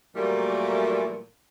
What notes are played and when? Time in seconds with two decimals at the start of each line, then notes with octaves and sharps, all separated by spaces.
0.15 A#2 E3 F#3 G3 A3 A#3